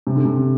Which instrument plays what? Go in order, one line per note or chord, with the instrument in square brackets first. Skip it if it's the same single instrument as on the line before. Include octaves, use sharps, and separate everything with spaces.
[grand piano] C3
D3
C3